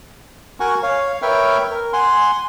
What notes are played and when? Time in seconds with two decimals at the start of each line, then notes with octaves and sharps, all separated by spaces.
0.60 F#4 A#4 F#5 G#5 C#6
0.83 C#5 F5
1.22 A#4 B4 C#5 E5 G5 F6
1.71 A#4
1.93 F#5 G#5 C6